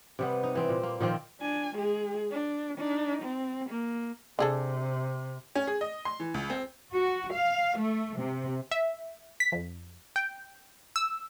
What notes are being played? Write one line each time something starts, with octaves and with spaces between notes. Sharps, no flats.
C3 G3 B3
D#4
E3 C4
A#2
A#3
A#2 D#3 F3 C4
D4 G#5
G#3 G#4
D4
D4 D#4
C4
A#3
C3 D4 G#4 A4
C#4
G#4
D#5
C6
E3
C#2
C4
F#4
F5
A3
C3
E5
B6
F2
G5
E6